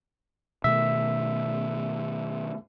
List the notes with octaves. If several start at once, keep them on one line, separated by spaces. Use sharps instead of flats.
B2 D#3 A3 E5